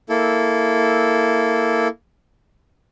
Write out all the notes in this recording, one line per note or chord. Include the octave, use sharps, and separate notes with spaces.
A#3 E4 A4